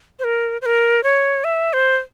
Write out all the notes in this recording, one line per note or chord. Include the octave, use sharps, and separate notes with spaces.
C5
A#4
C5
A#4
C#5
E5
C5